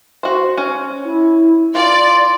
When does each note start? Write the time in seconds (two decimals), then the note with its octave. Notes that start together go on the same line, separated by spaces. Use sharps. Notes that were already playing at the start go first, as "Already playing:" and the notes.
0.23 F#4 C5
0.58 C#4
1.05 E4
1.75 F4 D5 C6